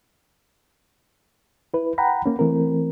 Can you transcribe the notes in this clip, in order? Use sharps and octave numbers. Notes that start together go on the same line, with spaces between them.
E4 B4
F#5 G5 A#5 B5
A#3 C#4
E3 A3 C4 A#4